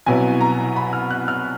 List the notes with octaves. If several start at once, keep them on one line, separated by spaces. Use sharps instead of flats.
C2 B2 F#3 B3 E4 G#5
A#5
B5
F6
F#6
F6